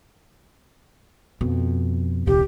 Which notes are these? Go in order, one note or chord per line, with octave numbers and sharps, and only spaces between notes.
F2 B2
E1 C#2 G4